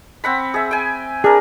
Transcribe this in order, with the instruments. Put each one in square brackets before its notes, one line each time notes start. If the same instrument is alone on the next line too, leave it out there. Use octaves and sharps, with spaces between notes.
[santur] C4 F#5 B5
G#4 E5
G5 G#5
[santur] D4 A#4 [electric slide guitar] G#4